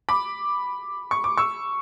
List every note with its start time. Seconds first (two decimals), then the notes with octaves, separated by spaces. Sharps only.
0.09 B5 D6
1.11 C#6
1.24 D6
1.37 C#6 E6